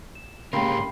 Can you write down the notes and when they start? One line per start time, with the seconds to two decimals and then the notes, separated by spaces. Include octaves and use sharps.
0.15 E7
0.53 G#2 C#3 A#3 G4 A#4 G5 B5 C6